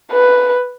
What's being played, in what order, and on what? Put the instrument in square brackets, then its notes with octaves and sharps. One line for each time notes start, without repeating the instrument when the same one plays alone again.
[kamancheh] B4